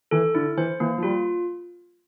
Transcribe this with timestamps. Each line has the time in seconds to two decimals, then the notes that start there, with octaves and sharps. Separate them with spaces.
0.11 E3 A4
0.35 D3 E4
0.57 E3 C5
0.80 E3 A#3
0.98 F3
1.03 G3 F4